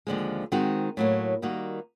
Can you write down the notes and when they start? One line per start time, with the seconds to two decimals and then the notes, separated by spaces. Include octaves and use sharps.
0.07 D#2 D3 F3 G#3
0.52 D#3 G#3 C4 D#4 F#4
0.97 A2 F#3 A#3
1.42 D#3 G3 A#3 D#4 F#4